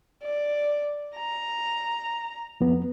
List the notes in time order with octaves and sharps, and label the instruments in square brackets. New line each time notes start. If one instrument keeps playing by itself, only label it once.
[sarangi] D5
A#5
[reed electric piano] F2 B3